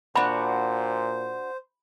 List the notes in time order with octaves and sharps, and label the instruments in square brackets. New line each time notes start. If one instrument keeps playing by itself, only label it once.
[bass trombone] A#2 [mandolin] D4 F#4 [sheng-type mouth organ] C5 [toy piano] B5